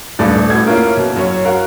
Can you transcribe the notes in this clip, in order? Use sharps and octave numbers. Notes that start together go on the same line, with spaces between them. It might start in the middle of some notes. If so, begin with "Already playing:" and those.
D#1 G2 A3 D5
A2 F#4 G#6
A#3 C#4 E4 F4 A#4
B2
F#2 C#5
F#4 A#4 F5